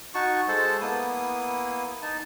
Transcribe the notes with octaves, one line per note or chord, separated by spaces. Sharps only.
D#4 F#4 A5 C#6
G#3 A4 C5 A5
A#3 B3 E4 D#6
D#4 A5